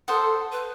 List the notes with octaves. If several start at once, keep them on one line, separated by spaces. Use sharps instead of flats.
A4 C5 F#5 A5 D#6
B4